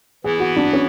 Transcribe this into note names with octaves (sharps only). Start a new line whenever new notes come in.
E3 B3 E4 G#4
F#4
D4
C#4